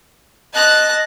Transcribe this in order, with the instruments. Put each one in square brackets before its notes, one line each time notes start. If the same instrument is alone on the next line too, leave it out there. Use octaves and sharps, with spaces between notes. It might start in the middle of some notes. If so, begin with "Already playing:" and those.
[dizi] D#5 [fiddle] A5 F#6